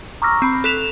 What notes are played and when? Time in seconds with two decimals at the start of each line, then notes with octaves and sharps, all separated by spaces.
0.22 A#5 C#6 D6 E6 F6 A#6
0.42 C4 B5
0.64 A4 F#6 B6 E7 F7